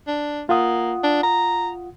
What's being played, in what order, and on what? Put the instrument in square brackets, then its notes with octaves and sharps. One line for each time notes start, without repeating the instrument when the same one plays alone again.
[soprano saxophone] D4
[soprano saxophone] A#3 [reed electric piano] F4 F#5 D#6
[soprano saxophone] D4
A#5